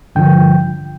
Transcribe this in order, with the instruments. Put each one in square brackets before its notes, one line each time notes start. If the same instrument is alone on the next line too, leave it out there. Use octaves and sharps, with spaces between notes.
[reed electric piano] G2 D3 F3 G5